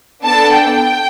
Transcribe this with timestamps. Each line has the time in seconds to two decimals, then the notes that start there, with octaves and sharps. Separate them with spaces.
0.25 B3 D4 A4 A5
0.56 G5